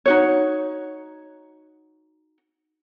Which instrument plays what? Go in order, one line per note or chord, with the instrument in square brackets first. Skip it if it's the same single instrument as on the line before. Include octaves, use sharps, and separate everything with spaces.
[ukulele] D#4 F#4 C#5